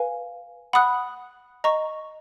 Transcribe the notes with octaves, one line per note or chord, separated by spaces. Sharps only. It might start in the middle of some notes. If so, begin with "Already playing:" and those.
Already playing: B4 F5 G#5
F#5 B5 D#6 F#6
D#5 A#5 C#6